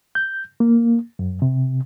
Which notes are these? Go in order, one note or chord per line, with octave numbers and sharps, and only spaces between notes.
G6
A#3
F#2
C3